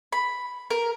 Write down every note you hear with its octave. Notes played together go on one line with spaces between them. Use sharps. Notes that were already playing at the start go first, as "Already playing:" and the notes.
B5
A#4